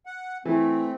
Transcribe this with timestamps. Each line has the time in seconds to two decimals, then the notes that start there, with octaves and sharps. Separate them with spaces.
0.06 F#5
0.45 E3 A3 C4